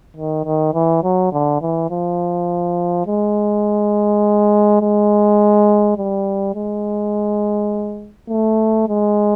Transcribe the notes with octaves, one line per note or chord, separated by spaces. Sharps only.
D#3
D#3
E3
F#3
D3
E3
F3
G#3
G#3
G3
G#3
A3
G#3